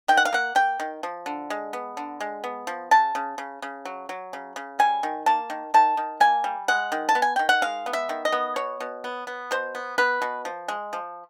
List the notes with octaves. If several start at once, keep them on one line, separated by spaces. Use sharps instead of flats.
D#3 G5
F#5
F5
A#3 F#5
A#3 G5
D#3
F3
D3
G#3
B3
D3
G#3
B3
F3
C#3 A5
C#3
C#3
C#3
F#3
F#3
C#3
C#3
G3 G#5
D#3
A#3 A5
D#3
D#3 A5
D#3
A#3 G#5
G3
G#3 F#5
D#3
A5
B3
G#5
D#3 G5
F#5
G#3 F5
B3
E5
D#3
D#5
B3
B2 C#5
B2
B3
B3
B2 C5
B3
B3 B4
B2
F3
G#3
F3